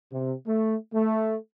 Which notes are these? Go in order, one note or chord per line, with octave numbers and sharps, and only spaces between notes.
C3
A3
A3